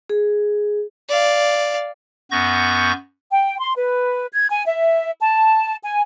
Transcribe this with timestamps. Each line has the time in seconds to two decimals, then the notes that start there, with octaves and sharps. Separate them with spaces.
0.09 G#4
1.09 D5 F5
2.31 F#2 B3 C#6 G6 A#6
3.31 G5
3.59 C6
3.77 B4
4.33 G#6
4.51 G#5
4.66 E5
5.20 A5
5.84 G#5